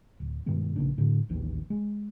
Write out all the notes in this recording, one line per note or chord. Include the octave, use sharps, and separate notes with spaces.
D1
G2 B2 D#3 G#3
A#1 C#3 A#3 D4
A2 D3
D#1 A1 D#2 E3
G#3